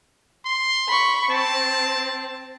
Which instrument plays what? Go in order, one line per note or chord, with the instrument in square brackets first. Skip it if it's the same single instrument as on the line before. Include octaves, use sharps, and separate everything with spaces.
[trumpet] C6
[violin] B5 C#6
[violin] C4 [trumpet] A5